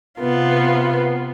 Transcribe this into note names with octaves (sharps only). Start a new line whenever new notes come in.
C3 B3 F4